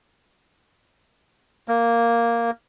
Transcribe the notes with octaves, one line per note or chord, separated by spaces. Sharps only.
A#3